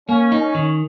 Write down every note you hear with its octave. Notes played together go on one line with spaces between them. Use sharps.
A#3 C#4
D#4
C#4
D#3